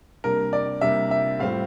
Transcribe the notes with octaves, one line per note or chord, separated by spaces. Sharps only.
C3 G3 A#3 D4 A#4
D5
C3 G3 A#3 D4 E5
E5
A2 G3 C4 F4 F5